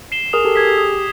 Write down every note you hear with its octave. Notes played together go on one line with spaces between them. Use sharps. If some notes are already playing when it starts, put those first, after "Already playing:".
C7 E7 G7
G#4 A#4 D#6
G4 A4
G#4 G#6 B6
G4
D#6